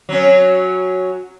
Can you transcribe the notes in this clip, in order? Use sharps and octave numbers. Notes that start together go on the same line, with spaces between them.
F#3 C#4